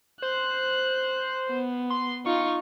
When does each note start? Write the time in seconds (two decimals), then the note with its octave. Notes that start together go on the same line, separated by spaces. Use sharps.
0.22 C5 F#6
1.50 B3
1.90 C6
2.26 D#4 F4 C#6